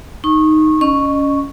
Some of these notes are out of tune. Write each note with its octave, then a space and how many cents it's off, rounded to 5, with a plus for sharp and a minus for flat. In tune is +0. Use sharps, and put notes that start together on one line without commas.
D#4 +0 C#6 -25
C#4 +20 D#5 -30 C#6 +0